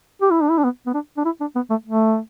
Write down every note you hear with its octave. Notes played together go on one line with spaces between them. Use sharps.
G4
E4
D4
E4
D4
B3
B3
D4
D4
E4
D4
B3
A3
A3